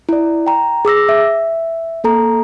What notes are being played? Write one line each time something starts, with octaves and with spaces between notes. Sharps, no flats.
E4 D5
G5 A#5
G#4 D6 E6 A#6
E5
A#3 A4 A#5